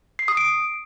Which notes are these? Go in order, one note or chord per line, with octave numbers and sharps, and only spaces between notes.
C7
D#6
D7